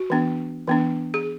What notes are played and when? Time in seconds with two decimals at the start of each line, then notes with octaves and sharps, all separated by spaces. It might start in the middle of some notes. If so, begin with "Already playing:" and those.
Already playing: F#4
0.10 E3 B3 D4
0.67 E3 B3 D4
1.14 G#4